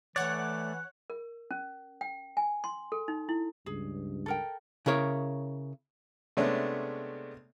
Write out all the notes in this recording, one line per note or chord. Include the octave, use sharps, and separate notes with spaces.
E3 A3 C#5 D5 F#5 F#6
A#4
C#4
G5
G#5
C6
A4
D#4
E4
C#2 G2 G#4
A4 A#4 G5
C#3 E4 A#4 C#5
C3 G#3 A3 B3 C#4 D4